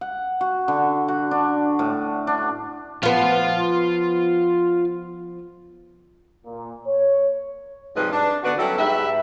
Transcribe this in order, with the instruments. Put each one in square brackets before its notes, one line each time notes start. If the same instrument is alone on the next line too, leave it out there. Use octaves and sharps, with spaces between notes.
[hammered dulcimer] F#5
F#4
D3
F#4
D4
A2
D4
[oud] F3 B3 [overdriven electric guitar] F4 F5
[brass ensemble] A#2
C#5
[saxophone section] G#2 C3 F3 G3 B4 D#5
D4
D3 B3 D4 F#4 B4 D5
F#3 G3 C#4 E4 A4 B4
G#2 G4 B4 E5